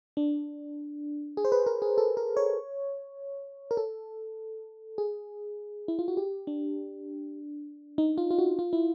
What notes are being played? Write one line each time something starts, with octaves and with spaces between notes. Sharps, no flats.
D4
G#4
C5
B4
A#4
G#4
A4
A#4
C#5
A#4
A4
G#4
E4
F4
F#4
G4
D4
D#4
F4
F4
F#4
F4
E4